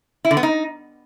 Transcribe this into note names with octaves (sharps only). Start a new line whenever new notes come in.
E4
D3
B3
D#4